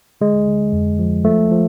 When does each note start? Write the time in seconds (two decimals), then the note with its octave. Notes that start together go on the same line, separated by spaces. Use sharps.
0.21 D3 G#3
0.48 D3
0.72 F2
0.99 F3
1.25 F3 A3
1.51 F3